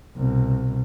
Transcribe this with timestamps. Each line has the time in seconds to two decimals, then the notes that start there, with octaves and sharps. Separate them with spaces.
0.16 C2 B2